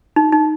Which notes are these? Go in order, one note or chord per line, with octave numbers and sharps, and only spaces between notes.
D#4
D#4